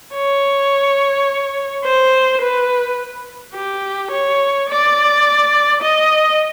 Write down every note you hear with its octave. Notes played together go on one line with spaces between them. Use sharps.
C#5
C5
B4
G4
C#5
D5
D#5